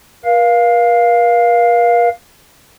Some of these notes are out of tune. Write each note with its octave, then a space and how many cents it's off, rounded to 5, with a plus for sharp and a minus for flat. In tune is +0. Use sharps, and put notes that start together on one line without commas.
A#4 +45 F5 +0